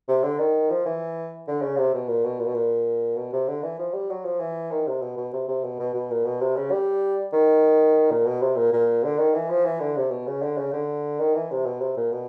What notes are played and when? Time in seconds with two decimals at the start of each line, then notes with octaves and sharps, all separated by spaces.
0.08 C3
0.23 D3
0.39 D#3
0.70 F3
0.86 E3
1.48 D3
1.62 C#3
1.77 C3
1.94 B2
2.08 A#2
2.25 B2
2.40 A#2
2.47 B2
2.54 A#2
3.17 B2
3.33 C3
3.48 D3
3.63 E3
3.79 F3
3.94 G3
4.10 F#3
4.25 F3
4.40 E3
4.71 D#3
4.87 C3
5.02 B2
5.17 B2
5.33 C3
5.48 C3
5.64 B2
5.80 B2
5.94 B2
6.11 A#2
6.25 B2
6.42 C3
6.57 C#3
6.71 G3
7.33 D#3
8.11 A#2
8.26 B2
8.42 C3
8.57 A#2
8.73 A#2
9.04 D3
9.18 D#3
9.35 E3
9.50 F3
9.65 E3
9.80 D3
9.97 C3
10.11 B2
10.27 C#3
10.43 D3
10.58 C#3
10.73 D3
11.20 D#3
11.35 E3
11.51 C3
11.66 B2
11.81 C3
11.97 A#2
12.12 B2